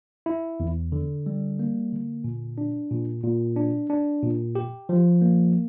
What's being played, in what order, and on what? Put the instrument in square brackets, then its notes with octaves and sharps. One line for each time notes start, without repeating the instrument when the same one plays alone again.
[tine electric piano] E4
E2
D3
G3
A#3
D3
A#2
D4
A#2
A#2
D4
D4
A#2
G4
F3
A#3